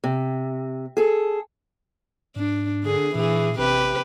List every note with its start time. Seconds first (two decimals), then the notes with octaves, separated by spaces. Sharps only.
0.04 C3
0.97 G#4 A4
2.36 G#2 D4
2.84 D3 G#4
3.15 A#2 E3 G#4
3.58 A1 C3 G4 B4